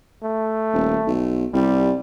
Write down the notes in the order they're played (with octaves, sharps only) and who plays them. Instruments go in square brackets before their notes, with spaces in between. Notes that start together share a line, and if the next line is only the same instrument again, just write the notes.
[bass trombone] A3
[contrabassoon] D#1
B1
[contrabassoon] C2 [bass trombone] G3